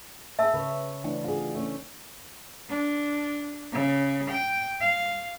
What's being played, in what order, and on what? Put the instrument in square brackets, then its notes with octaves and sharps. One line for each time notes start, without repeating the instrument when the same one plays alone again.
[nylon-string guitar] B3 E4 G#4 [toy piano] E5 A5 E6
[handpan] C#3 [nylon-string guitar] B4 C#5
[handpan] E3 A3 D4 [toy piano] G5
[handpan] C4 [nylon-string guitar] F4 F#4 G#4
[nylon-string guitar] A3 C#4
[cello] D4
C#3
G5
F5